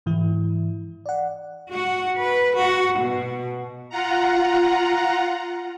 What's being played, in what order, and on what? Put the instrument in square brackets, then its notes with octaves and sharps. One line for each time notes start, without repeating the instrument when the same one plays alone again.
[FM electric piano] G#2 E3 E4
D5 F#5
[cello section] F#4
B4
F#4
B2
[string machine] F4 F#5 A#5